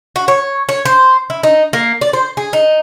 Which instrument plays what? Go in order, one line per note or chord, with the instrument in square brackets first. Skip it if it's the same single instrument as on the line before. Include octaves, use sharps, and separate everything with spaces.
[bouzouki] F#4
C#5
C#5
C5
E4
D#4
A#3
D5
C5
G#4
D#4